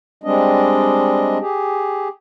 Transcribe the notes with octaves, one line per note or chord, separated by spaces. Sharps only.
G3 G#3 C4 D4 D#5
G4 G#4